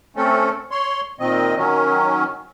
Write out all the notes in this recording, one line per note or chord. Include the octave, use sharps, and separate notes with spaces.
A3 C4 C#4 A4
C#5 C6
A#2 D#3 C4 D#5
D#3 F#3 C#4